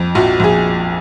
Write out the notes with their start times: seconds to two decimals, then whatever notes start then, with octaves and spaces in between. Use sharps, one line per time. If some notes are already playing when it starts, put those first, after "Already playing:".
Already playing: F2 F3
0.15 A#1 F#4
0.40 A#1 G#4